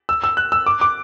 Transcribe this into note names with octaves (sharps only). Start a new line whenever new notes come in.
E6
E6
F#6
E6
D6
D6